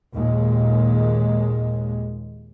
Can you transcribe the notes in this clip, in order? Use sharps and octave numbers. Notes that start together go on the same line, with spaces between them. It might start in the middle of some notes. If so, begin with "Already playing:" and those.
D#2 A#2 G#3